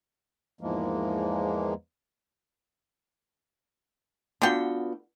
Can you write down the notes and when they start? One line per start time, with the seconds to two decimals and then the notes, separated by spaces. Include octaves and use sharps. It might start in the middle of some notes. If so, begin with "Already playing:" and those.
0.61 E2 G#2 E3 F3 G#3 A#3
4.42 D3 B3 F4 F#4 G5